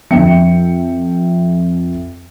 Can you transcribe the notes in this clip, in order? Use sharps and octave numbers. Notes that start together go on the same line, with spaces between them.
F2 E5 G5 C#7